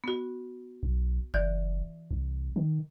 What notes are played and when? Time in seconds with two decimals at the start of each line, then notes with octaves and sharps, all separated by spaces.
0.04 B3 F#4
0.83 B1
1.34 F#1 E3 D5 F#6
2.11 C2
2.56 D#3